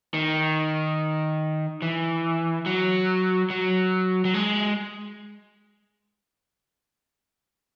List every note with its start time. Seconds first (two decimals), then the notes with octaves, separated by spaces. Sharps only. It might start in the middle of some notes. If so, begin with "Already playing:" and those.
0.14 D#3
1.82 E3
2.66 F#3
3.50 F#3
4.25 F#3
4.34 G#3